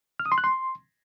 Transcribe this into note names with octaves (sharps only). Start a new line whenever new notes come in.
F6
D#6
C6
F#6
C6